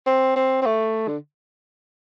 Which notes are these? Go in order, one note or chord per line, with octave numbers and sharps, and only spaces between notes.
C4
C4
C4
A3
D3